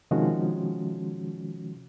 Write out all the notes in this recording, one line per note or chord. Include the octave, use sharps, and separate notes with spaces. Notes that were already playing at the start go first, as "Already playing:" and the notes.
C3 D#3 F3 G#3 C#4 F#4